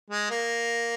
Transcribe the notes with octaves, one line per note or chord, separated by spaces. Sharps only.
G#3
A#3